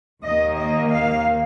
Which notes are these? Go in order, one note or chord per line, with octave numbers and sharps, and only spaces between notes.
D#2 D#3 A#3 D#5
D#5
F5